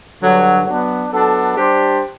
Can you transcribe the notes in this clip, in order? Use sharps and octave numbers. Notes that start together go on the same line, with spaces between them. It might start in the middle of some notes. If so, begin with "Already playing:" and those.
G2 D3 F#3
F#3 B3 D4
F#3 B3 D4 A4
G3 D4 G4 C5